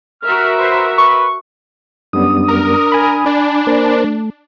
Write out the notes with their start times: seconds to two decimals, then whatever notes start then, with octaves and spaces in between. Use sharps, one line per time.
0.23 F#4 A#4 E5 F6
0.58 B4 C5
0.98 B4 C#6
2.13 F#2 G3 B3 D4 D#6
2.48 A#4
2.92 G#5 B5
3.26 D4
3.67 A#3 A#4 C5
4.04 A3